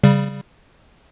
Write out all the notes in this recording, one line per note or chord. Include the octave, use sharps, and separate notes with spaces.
C#3 G3